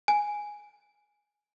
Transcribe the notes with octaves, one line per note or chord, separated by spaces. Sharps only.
G#5